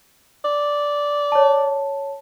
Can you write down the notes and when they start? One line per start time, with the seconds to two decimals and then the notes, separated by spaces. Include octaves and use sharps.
0.45 D5
1.32 C#5 A5